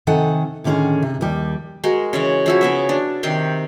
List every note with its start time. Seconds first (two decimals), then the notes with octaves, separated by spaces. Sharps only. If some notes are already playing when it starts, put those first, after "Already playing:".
0.07 C3 D#3 A4 F#5 G#5
0.64 A2 D3 D#3 C#4 G#4
1.02 C3
1.21 D#2 G3
1.84 G#3 F#4 A#4
2.13 C#3 E3 C#5
2.46 F3 E4 F#4
2.61 C#3 B3 E5
2.89 D4
3.23 C3 D#3 G4 C6